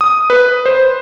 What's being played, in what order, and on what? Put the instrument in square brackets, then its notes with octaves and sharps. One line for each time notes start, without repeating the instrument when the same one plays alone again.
[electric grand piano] D#6
B4
C5